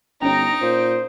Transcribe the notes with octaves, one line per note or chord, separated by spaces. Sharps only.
G1 C#4 D#4 C#5 A#5 D7
A#2 C5